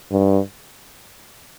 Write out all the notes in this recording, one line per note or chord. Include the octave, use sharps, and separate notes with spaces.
G2